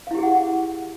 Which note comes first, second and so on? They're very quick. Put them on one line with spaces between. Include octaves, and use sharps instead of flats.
F5 E4 G4 G#4 F#5